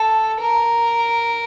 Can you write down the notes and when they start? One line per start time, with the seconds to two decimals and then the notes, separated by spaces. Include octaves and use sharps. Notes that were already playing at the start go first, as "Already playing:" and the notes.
Already playing: A4
0.41 A#4